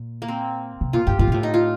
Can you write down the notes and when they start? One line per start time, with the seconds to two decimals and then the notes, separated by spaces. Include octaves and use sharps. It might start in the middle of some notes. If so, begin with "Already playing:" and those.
Already playing: A#2
0.22 A#3
0.28 C4
0.81 C3
0.93 A#2 F4
1.07 G2 G4
1.19 A2 F4
1.27 A#2
1.32 A2 F4
1.43 D#4
1.54 F4